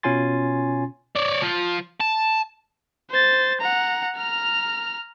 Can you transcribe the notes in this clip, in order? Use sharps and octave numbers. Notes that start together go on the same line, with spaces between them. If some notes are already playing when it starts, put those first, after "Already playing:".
B2 C#4 F4 G#5 C6 A6
C#5 D5
F3
A5
C5 A6
F#5 A#5
A#5 F6